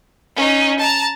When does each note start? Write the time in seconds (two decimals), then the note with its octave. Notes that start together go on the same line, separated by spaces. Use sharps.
0.36 C#4 D#4
0.79 A5 A#5